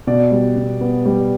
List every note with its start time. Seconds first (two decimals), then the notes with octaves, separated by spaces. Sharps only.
0.07 B2 D5
0.31 G3
0.56 B2
0.81 B3
1.05 G3